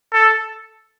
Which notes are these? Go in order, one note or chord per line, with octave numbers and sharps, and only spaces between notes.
A4